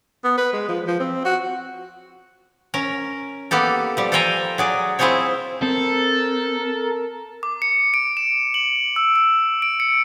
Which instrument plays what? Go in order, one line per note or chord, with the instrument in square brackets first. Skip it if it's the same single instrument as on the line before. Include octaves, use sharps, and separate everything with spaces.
[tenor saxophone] B3
B4
G#3
F3
F3
C4
F#4
[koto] C#4 A#4
A#3 B3 G4 A4
F3 G3
A4 C5 F5 G5 G#5 A#5
F#3 G#4 D5
C4 E4 F4 G#4 C5 C#5
[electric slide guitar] C4 [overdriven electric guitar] A4 [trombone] A#4
[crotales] D6
C#7
D7
E7
F#7
E6
E6
D7
C#7